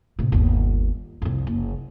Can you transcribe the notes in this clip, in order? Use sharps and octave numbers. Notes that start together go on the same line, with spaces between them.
A2 C3
G1 D#2
C2 F2
F#1